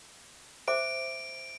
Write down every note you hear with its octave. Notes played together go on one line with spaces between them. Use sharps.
C5 E5 D6 D7